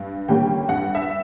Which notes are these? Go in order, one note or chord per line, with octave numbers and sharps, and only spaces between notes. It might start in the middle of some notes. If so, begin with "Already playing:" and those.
Already playing: G2
D3 G3 A#3 C#4 G5
G2 F#5
E5